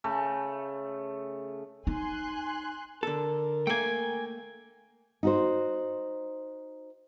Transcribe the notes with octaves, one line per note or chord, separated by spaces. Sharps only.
C#3 A3
D#4 G#5 C6 F#6
D3 A4 A#4
A3 A#3 G5 G#5
D#4 F#4 C5